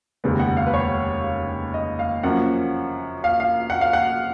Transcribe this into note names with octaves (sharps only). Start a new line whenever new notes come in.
F1 D#2 C#3 G#3 B3
F#5
F5
B4
C#5
D#5
F5
F#2 F3 A#3 C#4 F#5
F5
F5
F#5
F5
F#5